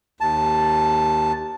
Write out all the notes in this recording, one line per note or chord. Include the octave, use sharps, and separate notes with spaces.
D#2 A5